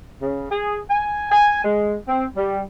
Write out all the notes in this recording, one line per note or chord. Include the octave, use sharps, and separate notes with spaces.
C#3
G#4
G#5
G#5
G#3
C4
G3